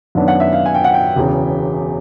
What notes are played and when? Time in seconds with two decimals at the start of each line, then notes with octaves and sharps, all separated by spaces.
0.15 F#2 D#3 F#3 B3 D4
0.28 F#5
0.40 E5
0.53 F5
0.66 G#5
0.75 G5
0.84 F#5
0.94 G5
1.16 E1 E2 C#3